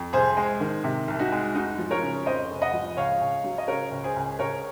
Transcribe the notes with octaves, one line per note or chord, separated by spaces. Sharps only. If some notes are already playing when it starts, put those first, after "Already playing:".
Already playing: F2
C2 G#4 C5
G#3
D#3
C3
C2
D#4 F#4
G#3
F1 D#4 F#4
F3
A#4 C#5
C#3
F2 C5 D#5
F1
D#5 F#5
F3
C#2 C#5 F5
C#2
F#3
D#5
C#3 A#4 C#5
C#2
G#4 C5
C#2
C#2 A#4 C#5